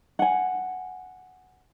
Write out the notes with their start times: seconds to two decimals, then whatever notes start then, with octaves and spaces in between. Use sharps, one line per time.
0.19 F#5 G#5